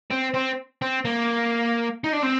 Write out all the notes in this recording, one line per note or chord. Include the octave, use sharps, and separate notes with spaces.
C4
C4
C4
A#3
D#4
D4
C4